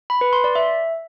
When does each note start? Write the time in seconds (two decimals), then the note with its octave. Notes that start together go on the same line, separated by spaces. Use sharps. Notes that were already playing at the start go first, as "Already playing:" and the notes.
0.10 B5
0.21 B4
0.33 C6
0.44 D5
0.55 E5